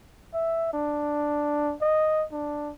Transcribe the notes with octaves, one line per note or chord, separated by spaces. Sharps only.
E5
D4
D#5
D4